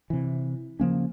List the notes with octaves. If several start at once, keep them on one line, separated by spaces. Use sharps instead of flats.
C3 E3
C#3 F3 A#3 C#4